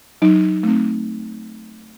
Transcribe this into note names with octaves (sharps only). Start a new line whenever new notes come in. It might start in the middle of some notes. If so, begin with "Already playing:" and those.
F#3 D#4
A3 C4